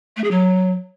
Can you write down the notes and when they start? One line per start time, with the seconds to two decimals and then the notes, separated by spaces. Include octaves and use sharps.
0.17 A3
0.24 G#4
0.31 F#3